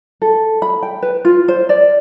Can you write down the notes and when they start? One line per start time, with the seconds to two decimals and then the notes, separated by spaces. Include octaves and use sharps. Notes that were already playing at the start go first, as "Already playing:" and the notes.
0.22 A4
0.62 B5
0.83 G5
1.02 B4
1.25 F4
1.48 C5
1.69 D5